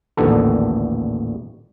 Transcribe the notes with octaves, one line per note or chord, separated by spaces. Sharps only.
A1 D#2 A#2 D3 B3 A4